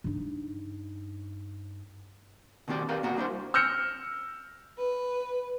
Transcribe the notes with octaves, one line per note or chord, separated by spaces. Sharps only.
G2 D#4
B2 D#3 C4 G4 D5
G4 A#4 B4 F5
A#2 B3 F#4 A#4
G3 D4 E4 C5
E6 F6 G6 A#6 C#7
B4